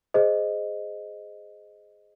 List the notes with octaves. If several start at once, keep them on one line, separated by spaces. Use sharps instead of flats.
G#4 C5 D#5